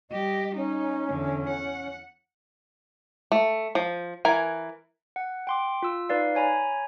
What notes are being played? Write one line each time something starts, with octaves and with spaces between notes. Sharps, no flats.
G3 G4 D#5
C#4 D#4
E2 D3
F#5
A3
F3
E3 A#4 G#5
F#5
G5 C6 D6
F4 E6
D#4 B4 D5 F5
C#5 G#5 A#5 B5